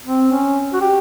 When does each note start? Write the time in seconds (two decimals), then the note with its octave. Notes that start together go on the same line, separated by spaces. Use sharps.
0.05 C4
0.31 C#4
0.73 F#4
0.81 G4